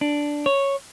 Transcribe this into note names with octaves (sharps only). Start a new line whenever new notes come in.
D4
C#5